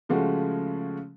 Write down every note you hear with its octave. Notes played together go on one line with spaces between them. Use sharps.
C#3 F3 G#3 A3 F#4